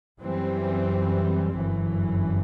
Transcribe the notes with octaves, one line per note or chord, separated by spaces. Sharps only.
F#2 E3 G3 C4
G1 F#2 E3